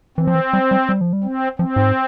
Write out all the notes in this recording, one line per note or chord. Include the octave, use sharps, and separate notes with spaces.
E3 C4
F3
E3
G3
G3
G3
F3
G3
C4
F3 C4
G#2